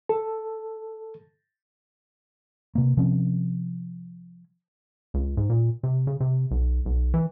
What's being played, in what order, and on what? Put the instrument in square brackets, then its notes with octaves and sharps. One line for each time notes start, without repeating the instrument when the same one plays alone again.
[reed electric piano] A4
[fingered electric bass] C3 A#3
C3 F3 C4 C#4
[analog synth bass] C#2
G#2
A#2
C3
C#3
C3
B1
B1
E3